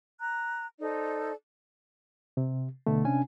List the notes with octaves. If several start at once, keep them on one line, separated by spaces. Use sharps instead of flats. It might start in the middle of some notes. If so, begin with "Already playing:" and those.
A#5 F#6
D#4 A4 C5 D5
C3
B2 D3 A3
C3 C#4 D4 G#5